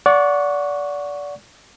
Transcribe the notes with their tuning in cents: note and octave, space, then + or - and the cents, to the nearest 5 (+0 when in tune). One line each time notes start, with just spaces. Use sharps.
D5 -25 F#5 -15 C#6 +0